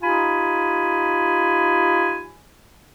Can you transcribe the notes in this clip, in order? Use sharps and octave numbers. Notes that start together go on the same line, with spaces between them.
D#4 F4 G4 G#5 B5